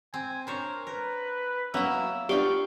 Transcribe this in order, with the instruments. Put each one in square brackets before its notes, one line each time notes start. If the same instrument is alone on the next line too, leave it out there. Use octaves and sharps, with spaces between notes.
[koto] C4 [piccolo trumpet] G#5
[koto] D4 C5 C#5 [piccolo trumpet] A#4
[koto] A#4 [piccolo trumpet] B4
[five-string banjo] F#3 B3 C#4 [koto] A#3 E4 [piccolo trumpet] E6
[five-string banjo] B3 D4 F4 [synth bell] G4 [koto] F5 G5 [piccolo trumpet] C#6